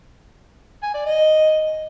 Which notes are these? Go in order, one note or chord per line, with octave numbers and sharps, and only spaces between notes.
G#5
D5
D#5